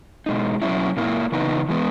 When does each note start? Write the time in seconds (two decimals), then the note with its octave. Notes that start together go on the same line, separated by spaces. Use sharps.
0.26 B2 G#3 D#4
0.62 B2 F#3 C#4 E4
0.97 A#2 A#3 E4
1.32 C#3 E3 B3 D#4
1.69 E3 G#3 B3